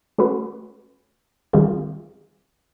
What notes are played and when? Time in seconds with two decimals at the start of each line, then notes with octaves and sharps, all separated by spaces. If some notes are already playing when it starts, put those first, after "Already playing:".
0.18 A3 C#4 F#4 B4
1.53 D#3 G3 C4 F4 G#4